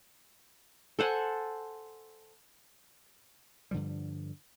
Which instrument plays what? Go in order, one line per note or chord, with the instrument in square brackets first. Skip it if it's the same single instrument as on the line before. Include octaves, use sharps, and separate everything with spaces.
[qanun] A4 C5 F#5 G#5
[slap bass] G2 D3 F3 G3